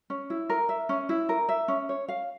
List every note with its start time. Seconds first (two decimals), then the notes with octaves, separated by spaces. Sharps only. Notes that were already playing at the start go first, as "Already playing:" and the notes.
0.10 C#4
0.30 E4
0.49 A#4
0.69 E5
0.89 C#4
1.09 E4
1.29 A#4
1.49 E5
1.68 C#4
1.89 C#5
2.08 F5